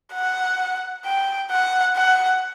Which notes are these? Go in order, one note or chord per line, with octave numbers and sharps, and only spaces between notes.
F#5
G5
F#5
F#5